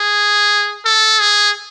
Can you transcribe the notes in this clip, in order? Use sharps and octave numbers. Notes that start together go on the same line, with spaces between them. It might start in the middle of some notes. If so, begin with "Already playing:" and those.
Already playing: G#4
A4
G#4